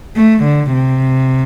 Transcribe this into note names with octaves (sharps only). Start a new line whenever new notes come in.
A3
D3
C3